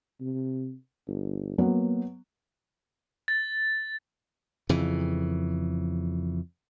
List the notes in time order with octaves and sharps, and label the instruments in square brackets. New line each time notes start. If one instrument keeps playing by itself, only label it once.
[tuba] C3
G1
[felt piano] F#3 B3 [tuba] A#3
[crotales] A6
[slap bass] F2 C#3 E3